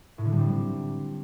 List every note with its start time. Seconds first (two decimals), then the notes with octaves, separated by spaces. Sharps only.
0.18 A2
0.25 D3
0.32 G3
0.39 C4